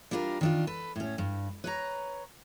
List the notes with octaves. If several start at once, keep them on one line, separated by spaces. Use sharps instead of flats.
G3 D4 E4 F4 A#4
D#3 D4 F4
A4 B4
A2 C#4
G2
B4 C#5 A#5